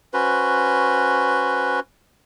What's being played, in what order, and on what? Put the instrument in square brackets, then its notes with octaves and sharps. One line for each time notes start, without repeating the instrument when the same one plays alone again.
[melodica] C#4 F#4 B4 C5